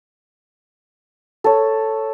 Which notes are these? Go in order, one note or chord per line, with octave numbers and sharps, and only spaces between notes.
A4 C#5